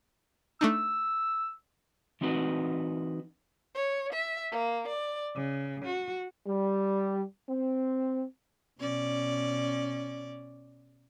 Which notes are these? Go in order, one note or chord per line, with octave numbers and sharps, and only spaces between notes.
A3 D4 D#4 E6
E3 C4 D#4 F#4 B4
C#5
E5
A#3
D5
C#3
F#4
G3
C4
B2 C#4 D5